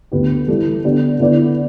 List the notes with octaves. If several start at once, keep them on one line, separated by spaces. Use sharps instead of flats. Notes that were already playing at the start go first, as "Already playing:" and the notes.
D2 D3 B3 G4 B4
E3 G3 E4 A4
D3 B3 D4 G4
D3 B3 E4 B4 D5